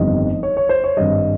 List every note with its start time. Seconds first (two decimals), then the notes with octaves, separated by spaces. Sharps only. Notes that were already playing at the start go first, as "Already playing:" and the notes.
Already playing: G1 F2 D#3 G3 D#5
0.43 C#5
0.57 C#5
0.69 C5
0.84 C#5
0.97 G#1 G2 G3 D#5